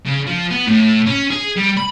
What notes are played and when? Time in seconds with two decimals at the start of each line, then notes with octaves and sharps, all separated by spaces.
0.05 C#3
0.27 F3
0.51 B3
0.67 A2
1.07 C#4
1.30 G#4
1.56 G3
1.77 B5